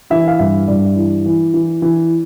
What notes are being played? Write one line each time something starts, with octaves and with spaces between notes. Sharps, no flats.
E3 E4 E5
F5
G2 E4 E5
G2 D5
E3
E3
E3
E3